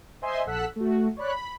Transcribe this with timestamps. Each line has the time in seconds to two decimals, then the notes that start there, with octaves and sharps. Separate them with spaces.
0.22 C5 D#5 E5 G#5 C6
0.46 A#1 A4 F#5 E6 F#6 B6
0.76 A3 F#4
1.17 C#5 D5 B5 F#6
1.32 B5